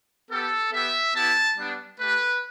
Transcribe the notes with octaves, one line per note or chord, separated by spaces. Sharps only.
B3 G4 A4
B3 G4 E5
B3 E4 G4 A5
G3 B3 D4
A3 G4 B4